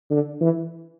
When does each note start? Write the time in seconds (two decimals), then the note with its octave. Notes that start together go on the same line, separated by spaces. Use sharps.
0.11 D3
0.41 E3